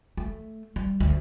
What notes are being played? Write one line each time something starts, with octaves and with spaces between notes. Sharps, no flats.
A3
G3
D2